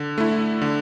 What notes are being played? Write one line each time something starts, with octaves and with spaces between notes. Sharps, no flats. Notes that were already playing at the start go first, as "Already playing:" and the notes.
Already playing: D3
A3 E4
D3